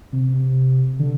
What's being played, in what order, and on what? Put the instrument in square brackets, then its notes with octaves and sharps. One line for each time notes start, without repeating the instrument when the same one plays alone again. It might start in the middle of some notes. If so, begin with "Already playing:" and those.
[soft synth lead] C3
D3